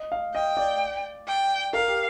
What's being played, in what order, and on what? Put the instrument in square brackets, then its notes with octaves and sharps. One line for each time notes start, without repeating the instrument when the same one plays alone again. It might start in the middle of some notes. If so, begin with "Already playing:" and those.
Already playing: [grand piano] D#5
F5
[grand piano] D#5 [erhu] G5
[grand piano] D5
[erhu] G5
[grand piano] A#4 [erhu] F5
[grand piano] G4